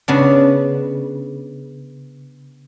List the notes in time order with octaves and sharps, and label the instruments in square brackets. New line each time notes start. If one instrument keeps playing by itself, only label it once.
[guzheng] C#3 B3 D4